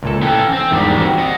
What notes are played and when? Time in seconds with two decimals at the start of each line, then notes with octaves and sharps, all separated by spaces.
0.03 C#2 A#2 A4
0.22 E3 C#4 A4 G5
0.53 C4
0.71 E2 G#2 D#3 G3 D4 G4
0.98 C4 F#4
1.19 D#5 F#5